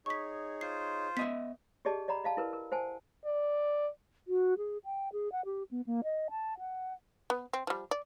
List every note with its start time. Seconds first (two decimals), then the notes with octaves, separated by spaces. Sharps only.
0.06 D#4 G#4 C#5 C#6 B6
0.61 F4 C5 C7
1.17 B3 D#5 E5 B6
1.85 G4 G#4 D5 D#5 A5
2.08 D5 D#5 F#5 A#5 B5
2.24 D#5 F5 A5
2.37 E4 A#4 B4
2.53 A#4
2.72 C5 F#5 G#5 A5
3.25 D5
4.28 F#4
4.57 G#4
4.84 G5
5.13 G#4
5.32 F#5
5.45 G4
5.71 B3
5.86 A#3
6.04 D#5
6.30 A5
6.58 F#5
7.30 B3
7.53 C4
7.67 F3 G3
7.91 D5